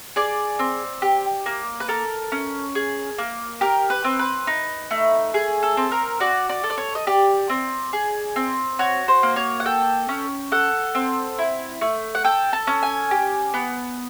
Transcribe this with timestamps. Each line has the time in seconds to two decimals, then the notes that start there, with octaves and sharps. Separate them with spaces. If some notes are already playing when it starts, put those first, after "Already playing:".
0.16 G#4 D5
0.59 C4
1.02 G4
1.46 A#3
1.80 B4
1.88 A4 A#4
2.32 C#4
2.75 G#4
3.18 A#3
3.61 G4 A#4
3.90 B4
4.04 C4
4.19 B4
4.47 D#4
4.91 A3
5.34 G#4
5.63 A4
5.77 C4
5.92 A#4
6.20 F#4 D5
6.49 D5
6.64 A4
6.70 D5
6.78 C#5
6.95 D#5
7.07 G4 D5
7.50 C4
7.93 G#4
8.36 C4
8.79 F#4 C#5
9.08 C5
9.23 A#3
9.36 C#5
9.60 F#5
9.66 A4 G5
10.09 C#4
10.52 A4 F#5
10.95 C4
11.38 E4
11.81 A3
12.15 F#5
12.24 A4 G5
12.53 A5
12.67 C#4
12.83 G#5
13.11 G4
13.54 B3